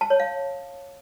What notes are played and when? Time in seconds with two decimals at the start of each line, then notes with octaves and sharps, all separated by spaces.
0.01 A5
0.10 C#5
0.20 F5